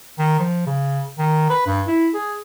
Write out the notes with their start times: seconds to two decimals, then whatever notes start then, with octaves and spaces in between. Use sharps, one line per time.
0.19 D#3
0.40 F3
0.67 C#3
1.18 D#3
1.50 B4
1.66 G2
1.88 E4
2.14 G#4